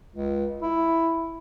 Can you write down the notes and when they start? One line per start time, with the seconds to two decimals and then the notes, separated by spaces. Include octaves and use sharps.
0.12 C#2
0.62 E4